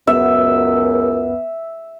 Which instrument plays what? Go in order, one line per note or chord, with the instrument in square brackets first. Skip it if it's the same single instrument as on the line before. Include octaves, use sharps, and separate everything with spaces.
[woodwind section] C#2 F#2 [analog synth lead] B3 [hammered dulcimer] E5